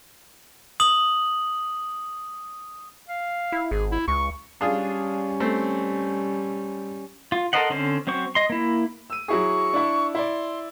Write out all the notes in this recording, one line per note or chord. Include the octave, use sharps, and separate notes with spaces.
D#6 F#7
F5
E4
G#1 G#4
E4
C#2 C#6
G3 C#4 D4 F4 G#4
A3 C4
F4
A4 A#4 C5 D#5 F#5
D3 C4 C#4 C5
F#3 C4 C5 C#6
D#5 C6
A#3 E4
E6 D#7
F#3 E4 G#4 C#6
D4 E4
E4 D5 C6